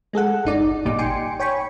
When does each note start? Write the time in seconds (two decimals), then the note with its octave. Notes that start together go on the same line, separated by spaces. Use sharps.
0.13 G#3 G#4 A4 F#5
0.45 G1 D#4 D5
0.85 G#1 A#2 G3 D#4 D6
0.98 G5 G#5 C6 C#7 D7
1.40 C#5 G5 G#5 B5 C#6